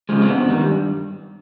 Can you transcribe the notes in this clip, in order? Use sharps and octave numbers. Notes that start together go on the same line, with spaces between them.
C#3 F3 G#3
C4
G2 B3
D#3 G3
G2